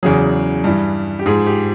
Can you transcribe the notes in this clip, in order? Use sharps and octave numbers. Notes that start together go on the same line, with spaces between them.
E2 C#3 F#3 G#4
G2 E3 G3
G4
G#2 F3 G#4
G4